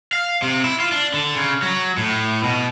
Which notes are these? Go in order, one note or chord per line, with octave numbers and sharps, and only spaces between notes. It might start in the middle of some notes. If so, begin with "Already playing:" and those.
F5
C3
E4
F4
D4
D3
C#3
F#3
A2
B2